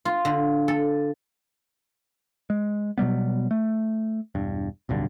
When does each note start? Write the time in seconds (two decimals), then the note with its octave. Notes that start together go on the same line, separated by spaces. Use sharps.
0.05 F4
0.25 D3
0.68 A4
2.50 G#3
2.98 B2 F#3 G3 B3
3.51 A3
4.35 E1 G2
4.89 D1 B1 G2 D3